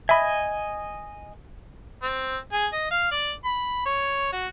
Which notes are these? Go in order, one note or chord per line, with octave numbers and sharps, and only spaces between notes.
D#5 E5 G#5 B5
C4
G#4
D#5
F5
D5
B5
C#5
F#4